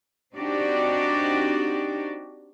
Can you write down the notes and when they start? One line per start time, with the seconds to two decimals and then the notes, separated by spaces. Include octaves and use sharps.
0.35 C4 D4 D#4 F#4 G4 D5